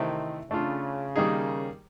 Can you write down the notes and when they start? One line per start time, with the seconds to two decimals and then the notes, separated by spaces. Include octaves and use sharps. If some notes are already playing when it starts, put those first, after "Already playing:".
Already playing: C3 D#3 E3 A3 C4 E4
0.50 C#3 A3 D4 F4
1.16 D#3 G3 A#3 D#4 G#4